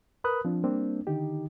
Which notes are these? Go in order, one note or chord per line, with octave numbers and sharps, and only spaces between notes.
A#4 B4 B5 D#6 F#6
F3 C4 D4
G3 A#3 C4 D4
D3 D#3 D#4 G4